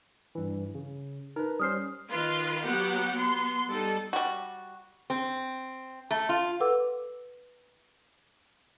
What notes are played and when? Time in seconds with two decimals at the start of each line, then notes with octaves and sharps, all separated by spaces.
0.35 G2 E3
0.75 C#3
1.36 D#4 A#4 B4
1.60 G3 C#4 C5 D#6 F6 C7
2.09 D#3 F4 B4
2.64 F#3 B3 G4 F#5
3.15 B3 C6
3.68 G3 D#4 A4
4.13 G3 F#4
5.10 C4
6.11 A3
6.29 F4
6.60 A4 B4 F#5 D6 E6